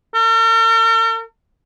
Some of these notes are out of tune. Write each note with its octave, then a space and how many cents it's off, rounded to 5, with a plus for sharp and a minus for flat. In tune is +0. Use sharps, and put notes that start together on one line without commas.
A#4 -45